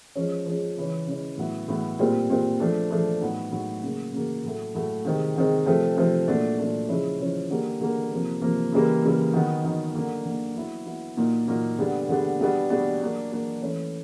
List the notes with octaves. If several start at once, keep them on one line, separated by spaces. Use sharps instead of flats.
F3 G#3 C#4
F3 G#3 C#4
C#3 E3 G#3 C#4
C#3 E3 G#3 C#4
A2 F#3 B3 E4
A2 F#3 B3 E4
A#2 G3 C4
A#2 G3 C4
F3 A3 D4
F3 A3 D4
A2 F#3 B3 D#4
A2 F#3 B3 D#4
C#3 F#3 A#3
C#3 F#3 A#3
A2 F#3 A3
A2 F#3 A3
C3 D#3 G#3 C4
C3 D#3 G#3 C4
C3 F3 A3 C4
C3 F3 A3 C4
A#2 F#3 A3 D4
A#2 F#3 A3 D4
C#3 F3 G#3 C#4 E4
C#3 F3 G#3 C#4 E4
D3 G3 A#3
D3 G3 A#3
C3 F3 A#3
C3 F3 A#3
C#3 E3 G3 A#3
C#3 E3 G3 A#3
D#3 F#3 B3 D#4
D#3 F#3 B3 D#4
D3 F#3 A#3
D3 F#3 A#3
F#3 B3 E4
F#3 B3 E4
A#2 F#3 A#3 D#4
A#2 F#3 A#3 D#4
D3 G3 B3 D4
D3 G3 B3 D4
B2 G3 B3 D4
B2 G3 B3 D4
F#3 A#3 D4
F#3 A#3 D4
E3 A3 C#4